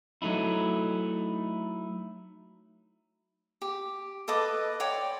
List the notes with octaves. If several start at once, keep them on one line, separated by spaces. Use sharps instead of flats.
F#3 A3 D#4 E4
G4
A4 B4 D#5 D6
C#5 D5 G5 C6